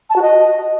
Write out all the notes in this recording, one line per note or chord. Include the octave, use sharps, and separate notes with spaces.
A5
F#4
D#5